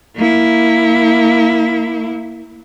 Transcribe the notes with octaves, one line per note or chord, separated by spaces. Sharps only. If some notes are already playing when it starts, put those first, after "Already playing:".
A#3 E4